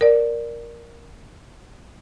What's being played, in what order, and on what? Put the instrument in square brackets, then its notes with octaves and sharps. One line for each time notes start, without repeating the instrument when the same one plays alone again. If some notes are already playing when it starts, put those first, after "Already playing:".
[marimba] A#4 D5